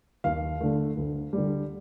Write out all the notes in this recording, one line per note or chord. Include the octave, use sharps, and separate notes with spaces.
D#2 F5
D3 A3
D2
D3 G3